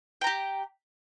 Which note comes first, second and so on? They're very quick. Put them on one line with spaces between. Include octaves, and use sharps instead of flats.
G5 A#5 G4